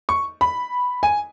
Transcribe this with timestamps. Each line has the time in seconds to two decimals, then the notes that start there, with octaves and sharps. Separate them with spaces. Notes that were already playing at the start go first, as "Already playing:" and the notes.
0.09 C#6
0.41 B5
1.03 G#5